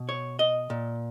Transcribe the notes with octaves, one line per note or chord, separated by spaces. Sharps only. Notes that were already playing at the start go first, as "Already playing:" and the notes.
Already playing: B2
C#5
D#5
A#2